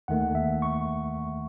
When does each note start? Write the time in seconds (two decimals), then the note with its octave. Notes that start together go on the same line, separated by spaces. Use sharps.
0.08 D#2 D#3 A3 F#5
0.35 E5
0.62 C#6